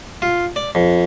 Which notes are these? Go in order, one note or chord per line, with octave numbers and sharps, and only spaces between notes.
F4
D5
F2